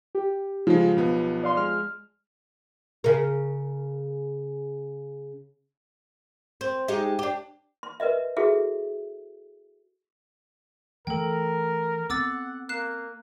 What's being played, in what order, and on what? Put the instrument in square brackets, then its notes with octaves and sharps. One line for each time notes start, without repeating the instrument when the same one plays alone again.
[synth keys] G4
[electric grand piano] C#3 G#3 [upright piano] F3
[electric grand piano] B1 B3
[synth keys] D5 F5 C6
[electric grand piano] G#3 [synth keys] F6
[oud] C#3 A#4
C4
G#3 D#4 G4
D4 G4
[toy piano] C6
A#4 B4 D#5 E5
E4 F#4 G#4 A4 E5
[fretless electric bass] E3 A3 [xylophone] A4 G5 [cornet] A#4
[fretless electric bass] B3 C4 [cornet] F#5 [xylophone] D6 E6 A6
[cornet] A#3 [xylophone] F#6 C7 E7